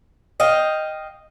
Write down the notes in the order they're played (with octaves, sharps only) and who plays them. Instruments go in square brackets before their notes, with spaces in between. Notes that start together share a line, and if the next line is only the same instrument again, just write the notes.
[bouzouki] D#5 F5 G5